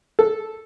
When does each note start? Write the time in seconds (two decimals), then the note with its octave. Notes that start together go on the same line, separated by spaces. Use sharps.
0.19 A4